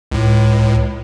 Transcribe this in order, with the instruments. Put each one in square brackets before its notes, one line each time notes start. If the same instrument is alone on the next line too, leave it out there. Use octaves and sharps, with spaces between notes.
[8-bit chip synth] C#2 A2